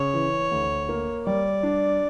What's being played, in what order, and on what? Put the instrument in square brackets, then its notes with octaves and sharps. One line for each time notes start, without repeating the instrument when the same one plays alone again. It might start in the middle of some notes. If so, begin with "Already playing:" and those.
Already playing: [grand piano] C#3 [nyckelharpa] C#5
[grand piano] E3
D2
A#3
[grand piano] G3 [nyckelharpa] D5
[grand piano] D4